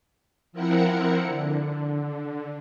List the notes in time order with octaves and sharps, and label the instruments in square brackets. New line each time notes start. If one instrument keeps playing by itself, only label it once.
[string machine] F3 C4 E4 A#4 F#5 C#7
D3